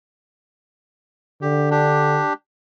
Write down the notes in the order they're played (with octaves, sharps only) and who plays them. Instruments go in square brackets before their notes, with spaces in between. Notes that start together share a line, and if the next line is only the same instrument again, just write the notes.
[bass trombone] D3 [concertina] G4
[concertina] D4 G4